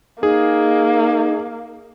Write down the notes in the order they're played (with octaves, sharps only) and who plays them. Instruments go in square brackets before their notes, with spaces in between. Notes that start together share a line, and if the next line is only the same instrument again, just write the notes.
[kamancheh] A#3 [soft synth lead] D#4 [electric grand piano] G#4